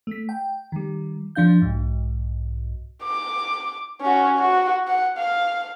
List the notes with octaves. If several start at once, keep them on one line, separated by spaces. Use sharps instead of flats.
A3 B6
G5
D#3 G3
F3 D4 F5 G6
B1 G#2
D6
C#4 F#4
F#4
F#5
F5